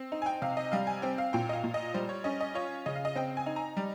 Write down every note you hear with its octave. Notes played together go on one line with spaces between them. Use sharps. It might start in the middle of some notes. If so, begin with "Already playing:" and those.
Already playing: C4
D#4
G#5
G5
C3 F5
D#5
G3 F5
G#5
C4 G5
F5
A#2 G5
D#5
F5
A#2
D#5
G3 C5
C#5
C#4 D#5
D#5
F4 C#5
C#3 D#5
F5
D#5
C4 G5
G#5
D#4
A#5
G3